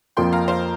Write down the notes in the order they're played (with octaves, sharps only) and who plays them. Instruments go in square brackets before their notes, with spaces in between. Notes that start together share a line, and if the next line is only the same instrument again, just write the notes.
[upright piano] F2 F3 A#3 F4 [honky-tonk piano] G5 C6
[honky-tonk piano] F5 A#5
C5 F5